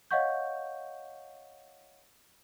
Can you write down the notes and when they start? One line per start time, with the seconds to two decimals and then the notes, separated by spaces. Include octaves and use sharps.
0.11 C#5 D#5 F5 F#5 C#6 G6